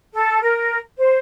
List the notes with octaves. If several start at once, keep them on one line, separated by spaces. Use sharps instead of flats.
A4
A#4
C5